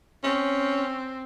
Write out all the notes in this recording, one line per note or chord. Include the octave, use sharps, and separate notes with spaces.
C4 C#4